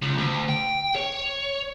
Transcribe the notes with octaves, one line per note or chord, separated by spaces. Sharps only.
C#2
D2
G5
C#5